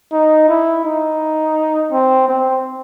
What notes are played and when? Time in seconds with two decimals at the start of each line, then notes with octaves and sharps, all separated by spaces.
0.13 D#4
0.49 E4
0.85 D#4
1.92 C4
2.28 C4